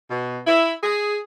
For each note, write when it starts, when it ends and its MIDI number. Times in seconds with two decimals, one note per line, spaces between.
0.11 0.40 47
0.47 0.73 64
0.84 1.19 68